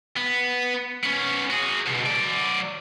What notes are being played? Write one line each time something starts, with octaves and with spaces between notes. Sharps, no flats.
B3
B3 C#4
F#4 G#4
C#2 B2
F#3 D5